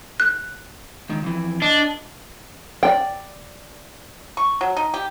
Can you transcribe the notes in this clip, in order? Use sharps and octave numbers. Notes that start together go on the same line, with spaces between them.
F#6
C#2 D#3
F2 E3
D4 D#5
D5 G5
C#6
F#3
D#4
G4